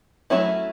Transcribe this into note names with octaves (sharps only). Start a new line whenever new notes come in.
F#3 A3 C#4 E4